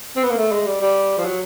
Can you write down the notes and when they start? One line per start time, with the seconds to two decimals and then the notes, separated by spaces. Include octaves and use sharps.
0.16 C4
0.23 B3
0.30 A#3
0.38 A3
0.52 G#3
0.66 G3
0.81 G3
1.18 F3
1.25 F#3